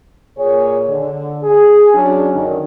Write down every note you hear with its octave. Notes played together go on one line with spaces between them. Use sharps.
A#2 G#4 C#5
D3
G#4
F#3 C#4 D4
F#2 D3 D#3